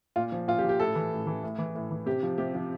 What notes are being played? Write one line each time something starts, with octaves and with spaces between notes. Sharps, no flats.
A#2 F4
F3
A#2 F4
G4
F3
G4
A2 A4
E3
A2
E3
A2
E3
A2
E3
C3 G4
F3
C3 G4
F3